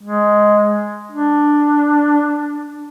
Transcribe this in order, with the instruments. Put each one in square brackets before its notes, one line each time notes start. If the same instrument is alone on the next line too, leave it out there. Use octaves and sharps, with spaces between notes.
[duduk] G#3
D4